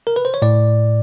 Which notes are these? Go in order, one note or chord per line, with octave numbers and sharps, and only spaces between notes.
A#4
B4
C5
C#5
A2 D5